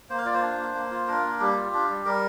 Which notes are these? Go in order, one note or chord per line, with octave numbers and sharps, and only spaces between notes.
A#3 C5
F5
F4 D5
C5
D4
A#3
A#3
F4
D4 A#4
A#3
G3 G4
F4
D4
G3
G3 A#4